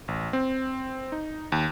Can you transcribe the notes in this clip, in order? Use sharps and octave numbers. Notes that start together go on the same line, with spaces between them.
A1
C4
D#4
D#2